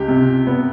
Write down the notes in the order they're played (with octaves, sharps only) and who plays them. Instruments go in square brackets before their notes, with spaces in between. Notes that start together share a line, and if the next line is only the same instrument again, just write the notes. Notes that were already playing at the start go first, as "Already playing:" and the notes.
Already playing: [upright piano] C#2 [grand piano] G4
[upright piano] C3
B3